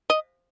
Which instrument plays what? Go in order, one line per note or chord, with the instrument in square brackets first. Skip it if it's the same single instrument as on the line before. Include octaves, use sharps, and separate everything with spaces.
[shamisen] D#5